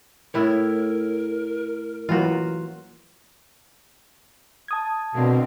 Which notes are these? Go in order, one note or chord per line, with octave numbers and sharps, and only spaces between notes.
A2 E4 A#4 C#5
E3 F#3 A#3 F4 F#4
A5 D#6 G#6
B2 D3 A#3 C4